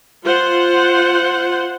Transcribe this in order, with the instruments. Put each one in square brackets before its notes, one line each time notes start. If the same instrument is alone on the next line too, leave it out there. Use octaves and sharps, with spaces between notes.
[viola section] F4 C5 F#5